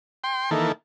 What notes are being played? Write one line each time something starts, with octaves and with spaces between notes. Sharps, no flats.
G5 C6
D#3 E3 A#3 A4